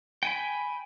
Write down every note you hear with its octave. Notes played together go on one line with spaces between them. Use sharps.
G5 G#5 B5